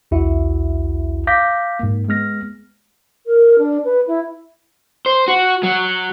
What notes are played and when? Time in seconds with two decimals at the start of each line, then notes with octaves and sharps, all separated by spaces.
0.11 B1 E2 E4 F#4 E5
1.27 F5 D6 G6 A#6 B6
1.79 G#2 A#3
2.08 G#3 B3 F6 A#6
3.27 A#4
3.59 D4
3.85 B4
4.07 E4
5.06 C5
5.28 F#4
5.63 F#3